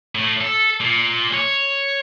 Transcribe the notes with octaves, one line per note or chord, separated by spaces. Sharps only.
A2
A4
A#2
C#5